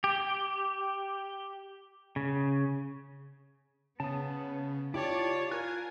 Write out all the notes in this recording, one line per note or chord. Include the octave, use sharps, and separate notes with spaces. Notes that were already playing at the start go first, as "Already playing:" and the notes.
G4
C#3
C#3 B3 A5 D#6
E4 F4 G4 C#5 D5 A5
F4 A#4 G#5 F#6